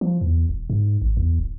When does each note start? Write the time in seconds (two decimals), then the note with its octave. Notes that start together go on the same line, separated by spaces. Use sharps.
0.01 F3
0.21 E2
0.49 D#1
0.70 G#2
1.02 G#1
1.17 E2
1.39 D1